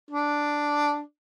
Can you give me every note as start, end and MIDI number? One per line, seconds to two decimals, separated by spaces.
0.10 1.00 62